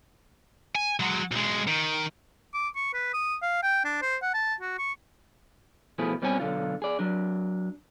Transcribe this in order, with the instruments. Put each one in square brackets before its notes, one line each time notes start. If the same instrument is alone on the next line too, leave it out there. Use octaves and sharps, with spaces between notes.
[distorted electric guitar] G#5
F#3 G#3
B1 G#3
D#3
[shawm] D6
C#6
B4
D#6
F5
G5
D4
C5
F#5
A5
F#4
C#6
[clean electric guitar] B2 F3 A3 E4 G#4
B2 G3 C4 C#4 G#4 G#5
B1 D3 F4
G#4 D5
F#3 D4